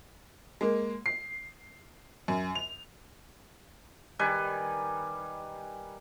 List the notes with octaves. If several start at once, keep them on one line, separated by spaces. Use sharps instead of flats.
G#3 A#3
C7
F#2
F7
D#3 G3 B4 G#5